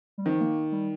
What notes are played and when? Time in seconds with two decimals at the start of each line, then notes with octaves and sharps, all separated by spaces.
0.18 G3
0.26 D#3 F3
0.41 A#3
0.72 G3